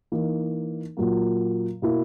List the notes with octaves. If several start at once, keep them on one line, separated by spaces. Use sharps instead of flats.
E3 A#3 D#4
A#2 F#3 A#3
B2 A#3 E4